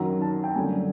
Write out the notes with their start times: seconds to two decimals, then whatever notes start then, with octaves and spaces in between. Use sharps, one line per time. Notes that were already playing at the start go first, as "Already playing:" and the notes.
Already playing: F#2 D#3 F#3 A#5
0.21 A5
0.44 G5
0.55 F#2 D3 G3 G#5